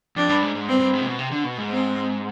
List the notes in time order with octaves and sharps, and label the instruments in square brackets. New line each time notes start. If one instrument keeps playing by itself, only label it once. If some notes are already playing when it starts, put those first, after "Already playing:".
[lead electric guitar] F2 [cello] D4
[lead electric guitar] G2
G#2
G#2
[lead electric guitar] G2 [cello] C4
[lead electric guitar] G2
G#2
C3
B2
C3
D3
B2
G#2
[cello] C4